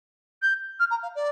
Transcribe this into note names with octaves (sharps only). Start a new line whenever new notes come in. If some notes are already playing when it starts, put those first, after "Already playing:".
G6
F6
A#5
F5
D5